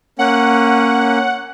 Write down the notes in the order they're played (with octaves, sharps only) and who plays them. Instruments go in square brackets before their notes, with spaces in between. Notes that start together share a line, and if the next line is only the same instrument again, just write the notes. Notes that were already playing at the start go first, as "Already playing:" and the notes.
[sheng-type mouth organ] A#3 C#4 [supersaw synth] F#5